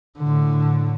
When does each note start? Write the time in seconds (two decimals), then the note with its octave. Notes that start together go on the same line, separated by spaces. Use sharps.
0.19 A2 D3